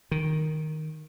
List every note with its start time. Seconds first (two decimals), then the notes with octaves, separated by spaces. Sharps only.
0.11 D#3